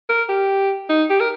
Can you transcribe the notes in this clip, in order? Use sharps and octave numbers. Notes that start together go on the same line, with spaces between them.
A#4
G4
D#4
G4
A#4